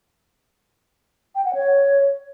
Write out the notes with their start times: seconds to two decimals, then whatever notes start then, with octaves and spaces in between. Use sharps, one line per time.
1.35 G5
1.45 F#5
1.55 C#5